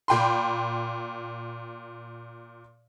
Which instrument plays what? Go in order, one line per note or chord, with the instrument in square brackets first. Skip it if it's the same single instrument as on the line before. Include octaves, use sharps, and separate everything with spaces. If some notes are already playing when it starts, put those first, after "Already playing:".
[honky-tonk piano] A#2 G5 B5 C6